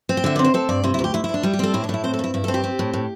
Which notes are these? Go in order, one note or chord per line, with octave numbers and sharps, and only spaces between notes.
C4
G5
D3 E5
C4 D5
C5
C4 A4
G2 D5
C3 E4
E4
D2
G4
D2 E4
E4
D2 D4
G3 E4
G4
C4 A4
A2 E4
D4
A2 E4
C4 C5
A4
G2 E4
G2 E4
A4
C4
G4
C4
A2
A2